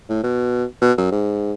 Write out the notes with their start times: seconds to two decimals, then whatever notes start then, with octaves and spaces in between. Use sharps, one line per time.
0.09 A2
0.23 B2
0.82 B2
0.98 F#2
1.12 G#2